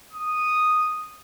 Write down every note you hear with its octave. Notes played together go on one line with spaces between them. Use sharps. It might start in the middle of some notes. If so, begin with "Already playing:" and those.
D#6